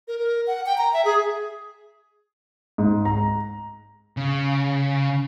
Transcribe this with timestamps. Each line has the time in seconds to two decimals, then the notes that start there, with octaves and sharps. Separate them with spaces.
0.08 A#4
0.19 A#4
0.47 F#5
0.66 G5
0.78 A#5
0.93 E5
1.05 G#4
2.78 G#2
3.05 A#5
4.17 C#3